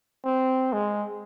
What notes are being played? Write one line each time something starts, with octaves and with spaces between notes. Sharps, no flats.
C4
G#3